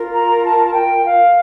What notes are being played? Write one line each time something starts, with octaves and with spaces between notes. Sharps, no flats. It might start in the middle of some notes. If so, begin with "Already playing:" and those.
Already playing: F4 A#4
A#5
A5
A5
G5
F5